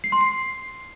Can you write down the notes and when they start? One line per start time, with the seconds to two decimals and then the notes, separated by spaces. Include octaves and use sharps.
0.04 C7
0.12 C6
0.21 C7